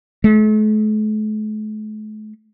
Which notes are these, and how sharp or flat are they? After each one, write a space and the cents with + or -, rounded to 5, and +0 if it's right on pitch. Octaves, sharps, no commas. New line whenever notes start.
A3 -45